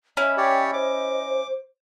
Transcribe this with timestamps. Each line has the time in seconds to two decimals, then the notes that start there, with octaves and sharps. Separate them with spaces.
0.17 C#4 E4 D#5
0.37 G4 C#5 D5 G5
0.73 C5 D6